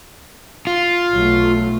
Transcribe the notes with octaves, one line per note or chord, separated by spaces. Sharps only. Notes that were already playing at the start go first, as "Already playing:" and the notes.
F4
B1 F#3 A3